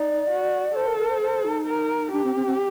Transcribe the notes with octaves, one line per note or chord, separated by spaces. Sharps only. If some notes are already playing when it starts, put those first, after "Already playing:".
Already playing: D#4 D5
F#4
A4 C5
A#4
A#4
C5
C5
D#4
A#4
D4 G4
C4
C4
C4